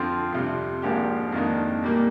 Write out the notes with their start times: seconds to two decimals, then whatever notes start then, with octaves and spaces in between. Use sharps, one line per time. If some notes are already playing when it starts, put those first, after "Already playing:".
Already playing: F2 D3 F3 C4 F4
0.32 F2 C3 G3
0.82 G#1 G#2 F3 A#3 D4 G4
1.32 F2 D#3 A#3 D4
1.82 A#2 G3 A#3